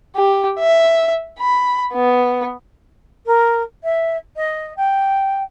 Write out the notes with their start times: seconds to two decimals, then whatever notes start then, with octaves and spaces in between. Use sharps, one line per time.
0.16 G4
0.60 E5
1.39 B5
1.93 B3
3.26 A#4
3.83 E5
4.36 D#5
4.76 G5